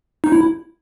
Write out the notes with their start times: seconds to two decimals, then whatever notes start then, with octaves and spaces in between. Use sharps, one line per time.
0.24 D#4
0.32 E4